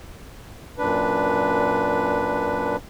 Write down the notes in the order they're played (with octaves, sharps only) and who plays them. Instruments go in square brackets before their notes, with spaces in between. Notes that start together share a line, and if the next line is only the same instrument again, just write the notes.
[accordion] F#2 A#2 D4 B4